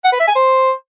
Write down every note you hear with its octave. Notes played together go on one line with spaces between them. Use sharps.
F#5
B4
E5
G#5
C5